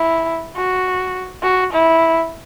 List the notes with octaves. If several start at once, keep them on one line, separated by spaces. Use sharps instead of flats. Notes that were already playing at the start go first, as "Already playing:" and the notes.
Already playing: E4
F#4
F#4
E4